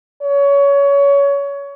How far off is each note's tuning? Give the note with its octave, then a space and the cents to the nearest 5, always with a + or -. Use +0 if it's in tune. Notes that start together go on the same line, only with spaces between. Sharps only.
C#5 +25